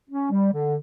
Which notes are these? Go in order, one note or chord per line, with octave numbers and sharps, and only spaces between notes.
C#4
G3
D3